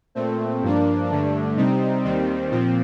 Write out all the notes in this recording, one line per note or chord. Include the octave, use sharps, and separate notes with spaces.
A#2 A3 C4
G2 F3 A#3 D4
G2 D3 A3 D4
C3 G3 C4 D#4
D#2 D#3 G3 C4
A#2 F3 C4